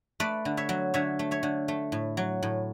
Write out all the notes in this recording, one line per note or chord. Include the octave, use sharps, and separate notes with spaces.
A3 B4 D5
D3
C#5 E5
F#3
D3 C#5 E5
A3
C#5 E5
D3
A3
A2
F#3
A2